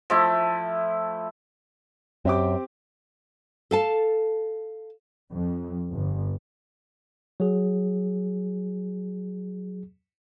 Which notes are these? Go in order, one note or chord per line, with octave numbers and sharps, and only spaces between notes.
F3 A3 E4
F#2 C4 G4 D6
A4 F5 A5
F2
G1
F#3 G#4